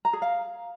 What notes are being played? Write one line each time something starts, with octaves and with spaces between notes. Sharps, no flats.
A#5
G#4
F5